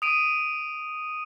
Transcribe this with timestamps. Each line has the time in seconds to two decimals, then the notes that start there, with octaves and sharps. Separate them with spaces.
0.02 D#6 D7 D#7